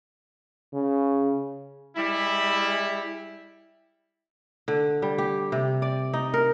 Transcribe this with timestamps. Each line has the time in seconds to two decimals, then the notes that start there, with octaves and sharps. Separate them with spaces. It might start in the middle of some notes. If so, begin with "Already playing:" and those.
0.74 C#3
1.97 G3 G#3 E4
4.68 D3
5.02 G3
5.18 G4
5.52 C3
5.82 D5
6.13 D#4
6.34 A#4